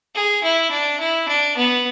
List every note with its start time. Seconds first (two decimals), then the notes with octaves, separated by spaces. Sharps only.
0.15 G#4
0.43 E4
0.71 D4
1.00 E4
1.28 D4
1.57 B3